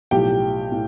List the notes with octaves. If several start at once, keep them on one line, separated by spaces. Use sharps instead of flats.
B1 A2 F3 G4 G5
A2